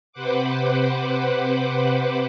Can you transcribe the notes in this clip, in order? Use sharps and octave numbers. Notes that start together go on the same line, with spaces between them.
C3 B4 C5 F#5 D6